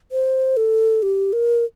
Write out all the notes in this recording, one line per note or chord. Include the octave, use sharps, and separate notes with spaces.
C5
A4
G4
A#4